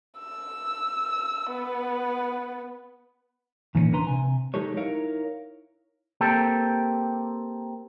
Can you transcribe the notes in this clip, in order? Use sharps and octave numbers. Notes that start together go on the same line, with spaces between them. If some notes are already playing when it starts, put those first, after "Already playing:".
E6
B3
A#2 D#3 E3 G3 A#3 C#4
C#2 E3 D4 B4 A#5 C6
C3 G#5
F#3 G#3 D#4 G4 A4 C#5
D#4 E4 A#4 C#5 F5
A#3 C4 G4 A4